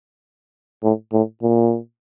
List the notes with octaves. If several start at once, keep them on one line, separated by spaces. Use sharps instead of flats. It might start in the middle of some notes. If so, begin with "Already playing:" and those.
A2
A2
A#2